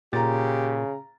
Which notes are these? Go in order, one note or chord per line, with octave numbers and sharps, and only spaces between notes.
A#2 C#3 G4 A#5 A6